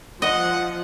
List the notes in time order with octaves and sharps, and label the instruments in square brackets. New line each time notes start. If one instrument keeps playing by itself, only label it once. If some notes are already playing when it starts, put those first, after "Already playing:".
[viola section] F3 [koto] D#5 [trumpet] F#5